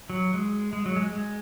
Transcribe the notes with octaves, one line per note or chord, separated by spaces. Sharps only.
F#3
G#3
G#3
F#3
G#3
G#3